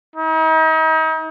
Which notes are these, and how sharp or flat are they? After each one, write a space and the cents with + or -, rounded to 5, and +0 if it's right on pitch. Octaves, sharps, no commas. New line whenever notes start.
D#4 +40